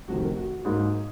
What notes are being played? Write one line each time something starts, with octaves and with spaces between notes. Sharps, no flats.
F1 F2 C3 D#3 F#4
A#4
F#4
F#4
G#2 F#3 A#3 D#4 G#4